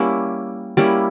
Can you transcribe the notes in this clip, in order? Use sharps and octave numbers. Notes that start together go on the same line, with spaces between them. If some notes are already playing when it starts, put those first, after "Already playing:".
Already playing: G3 A#3 C#4 E4
G3 A#3 C#4 E4